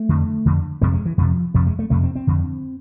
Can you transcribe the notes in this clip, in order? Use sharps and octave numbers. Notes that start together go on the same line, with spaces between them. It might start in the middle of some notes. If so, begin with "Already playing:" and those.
Already playing: A3
F2 D3
F2 D3
F2 C3 G#3
G#3
E3
F2 C3 F3
F2 C3 F3
G#3
A3
F2 C3 A3
C4
C4
F2 D3